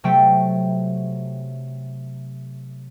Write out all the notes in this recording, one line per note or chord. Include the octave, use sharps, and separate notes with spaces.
C3 F#3 A3 A4 G5 B6